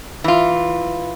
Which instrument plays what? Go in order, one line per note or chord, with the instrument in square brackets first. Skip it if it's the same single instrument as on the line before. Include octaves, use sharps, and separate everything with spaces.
[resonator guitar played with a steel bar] E3 F4